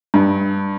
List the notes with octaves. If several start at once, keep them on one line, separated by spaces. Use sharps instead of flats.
G2